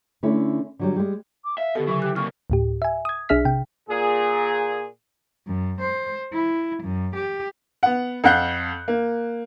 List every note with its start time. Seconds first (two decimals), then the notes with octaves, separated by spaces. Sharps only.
0.23 D3 A3 C#4 E4
0.79 D3 F#3 G3
0.96 G3 G#3
1.44 D6
1.58 E5 F5
1.75 B2 D3 G4 A4
1.87 C#3 E3 F#3 E4 C#6
2.02 G4 F#6
2.16 C3 A#3 C#6 F6
2.50 D2 A2 G4
2.82 E5 G#5
3.05 D#6 G#6
3.29 B1 D4 G#4 E5 F6 B6
3.45 C3 G5
3.89 A#2 G#4
5.47 F#2
5.80 C5
6.32 E4
6.83 F#2
7.16 G4
7.83 B3 F#5
8.24 F2 F5 F#5 F#6 G6
8.88 A#3